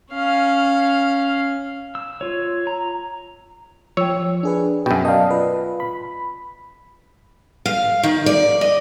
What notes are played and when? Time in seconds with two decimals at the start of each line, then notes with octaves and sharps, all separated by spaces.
0.12 C#4 F5
1.95 E6
2.21 F4 C#5
2.67 A#5
3.97 F3 C#5 G5 E6
4.43 D4 G#4 B4
4.86 F#2 B2 G5
5.05 D5 D#5 F5 A5
5.31 F4 B4
5.80 B5
7.66 F5
8.03 D#3
8.26 D5
8.61 D#5